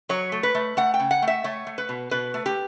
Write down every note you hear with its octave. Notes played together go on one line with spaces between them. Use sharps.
F#3 C#5
A3
B4
A3
A3 F#5
G5
C#3
F#5
A3
E5
A3 C#5
A3
B4
B2
B2 B4
A3
G4